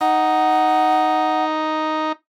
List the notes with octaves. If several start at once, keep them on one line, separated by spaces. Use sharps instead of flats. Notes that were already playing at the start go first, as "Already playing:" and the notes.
D#4 F#5